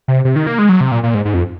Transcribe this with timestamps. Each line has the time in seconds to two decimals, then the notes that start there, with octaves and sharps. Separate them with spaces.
0.08 C3
0.25 C3
0.36 D#3
0.47 A#3
0.59 G#3
0.69 F#3
0.81 C3
0.92 A#2
1.03 A#2
1.14 G#2
1.25 G#2
1.34 F2